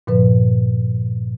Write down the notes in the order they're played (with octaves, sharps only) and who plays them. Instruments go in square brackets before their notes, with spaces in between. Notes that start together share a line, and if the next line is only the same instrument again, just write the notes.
[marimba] G2 A#2 D3 F3 B4